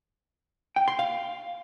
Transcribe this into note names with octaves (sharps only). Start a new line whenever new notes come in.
G5
C6
F5